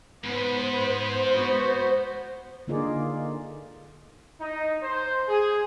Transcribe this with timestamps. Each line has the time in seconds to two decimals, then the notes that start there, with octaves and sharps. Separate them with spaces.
0.24 G#2 B3 B4 C5
1.35 B3 F#4
2.68 D3 A#3 D#4 F4 G#4 D5
4.41 D#4
4.82 C5
5.29 G#4